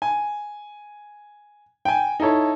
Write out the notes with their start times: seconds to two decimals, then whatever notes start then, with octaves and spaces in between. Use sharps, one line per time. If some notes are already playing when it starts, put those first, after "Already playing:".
0.02 G#5
1.85 G5 G#5
2.20 D#4 E4 A4 C#5